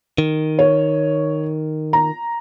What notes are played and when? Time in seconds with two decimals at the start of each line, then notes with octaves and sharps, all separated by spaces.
0.18 D#3
0.59 C#5
1.93 A#5